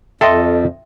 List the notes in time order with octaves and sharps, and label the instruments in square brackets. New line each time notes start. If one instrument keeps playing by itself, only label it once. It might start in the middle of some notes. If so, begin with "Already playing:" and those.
[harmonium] F2 [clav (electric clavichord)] A4 D#5 [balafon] E5 G5 C6